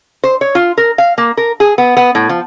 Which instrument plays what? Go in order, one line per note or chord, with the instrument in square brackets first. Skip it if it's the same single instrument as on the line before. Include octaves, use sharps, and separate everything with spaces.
[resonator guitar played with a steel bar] C5
C#5
F4
A#4
F5
A#3
A#4
G#4
B3
B3
A2
F3